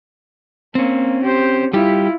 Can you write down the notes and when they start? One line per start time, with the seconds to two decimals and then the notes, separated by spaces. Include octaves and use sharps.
0.75 A#3 C4 C#4
1.23 G4 C5
1.73 G3 E4 F4 G4